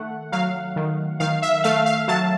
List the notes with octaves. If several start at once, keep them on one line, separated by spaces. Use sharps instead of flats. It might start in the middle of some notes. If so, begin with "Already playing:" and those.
Already playing: D#3 A3 F#5
F#3 F5
D#3
D#3 F5
E5
A3 F5
F5
F#3 A5